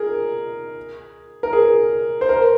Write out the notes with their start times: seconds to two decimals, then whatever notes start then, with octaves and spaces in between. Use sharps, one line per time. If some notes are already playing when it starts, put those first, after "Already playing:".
Already playing: G#4 A#4
1.43 A#4
1.53 G#4
2.21 C5
2.29 A#4